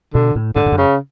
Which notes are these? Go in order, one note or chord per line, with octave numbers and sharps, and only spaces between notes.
B2 D3
A2
G#2 D3
G#2
F#2
C#3